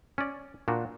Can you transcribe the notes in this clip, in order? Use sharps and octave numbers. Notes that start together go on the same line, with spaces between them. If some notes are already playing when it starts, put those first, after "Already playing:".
C#4 D5
A#2 D4 F#4